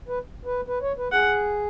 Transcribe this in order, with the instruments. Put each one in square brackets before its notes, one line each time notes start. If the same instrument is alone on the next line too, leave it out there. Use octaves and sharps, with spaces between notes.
[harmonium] B4
B4
B4
C#5
B4
[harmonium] G#4 [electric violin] F#5